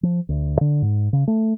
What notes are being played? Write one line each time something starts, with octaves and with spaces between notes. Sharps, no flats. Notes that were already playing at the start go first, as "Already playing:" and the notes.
F3
D2
D3
G#2
C#3
A3